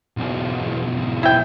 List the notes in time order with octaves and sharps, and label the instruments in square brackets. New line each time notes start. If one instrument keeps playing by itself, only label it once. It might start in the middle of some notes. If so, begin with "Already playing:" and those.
[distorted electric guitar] B1 E2
[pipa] E4 G5